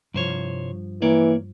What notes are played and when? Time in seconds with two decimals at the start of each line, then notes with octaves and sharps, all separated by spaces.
0.14 C2 G2 F3 C5 C#5
1.02 E3 A#3 C#5 D5